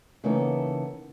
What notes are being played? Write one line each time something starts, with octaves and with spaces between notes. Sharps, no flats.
C#3 E3 A#3 B3 D#4 A4